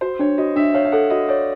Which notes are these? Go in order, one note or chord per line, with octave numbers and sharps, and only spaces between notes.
F#4 C5
D4 C#5
F#4 D#5
D4 E5
C#5 F5
F5
A4 F#5
F#4 D#5
C#5 D5